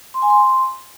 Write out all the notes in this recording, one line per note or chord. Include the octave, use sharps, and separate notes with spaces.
C6
G#5
C6